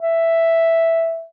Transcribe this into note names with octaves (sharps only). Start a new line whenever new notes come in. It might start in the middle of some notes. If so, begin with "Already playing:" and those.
E5